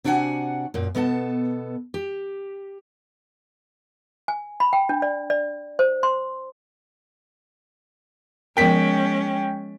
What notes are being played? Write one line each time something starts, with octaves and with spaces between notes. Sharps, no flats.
C3 D4 F#4 G#4 F#5 G#5
F#2 A#2
B2 B3 A4 A5
G4
G#5
B5
G5
D4
D5
D5
C5
C6
F3 G#3 B3 C#4 A#4 G5 B6